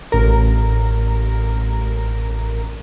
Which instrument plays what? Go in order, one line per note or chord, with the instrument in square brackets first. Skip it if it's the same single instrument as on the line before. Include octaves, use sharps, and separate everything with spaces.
[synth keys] A1 A#4